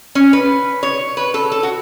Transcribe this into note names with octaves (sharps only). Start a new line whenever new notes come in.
C#4
B4
C#5
B4
A4
A4
F#4